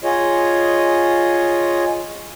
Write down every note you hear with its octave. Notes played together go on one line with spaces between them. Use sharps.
F4 G#4 C#5 D#5